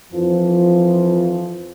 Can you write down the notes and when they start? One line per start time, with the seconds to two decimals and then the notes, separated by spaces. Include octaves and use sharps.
0.13 F2 E3 F3